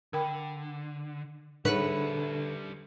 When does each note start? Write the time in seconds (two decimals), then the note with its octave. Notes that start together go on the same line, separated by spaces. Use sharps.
0.13 D3 A#4 G5 B5
1.65 D3 G3 D#4 G#4 B4 E5 C#7